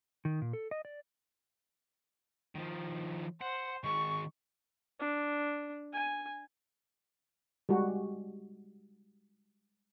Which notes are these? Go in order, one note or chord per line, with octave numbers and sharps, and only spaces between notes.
D#3
A#2
A4
D#5
D5
D#3 F3
C5 F#5
D#3 G#3 C#6
D4
G#5
G3 G#3 F#4